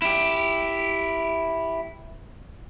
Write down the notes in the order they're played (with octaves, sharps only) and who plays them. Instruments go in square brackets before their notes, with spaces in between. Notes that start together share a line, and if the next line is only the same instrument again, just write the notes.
[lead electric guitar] E4 G4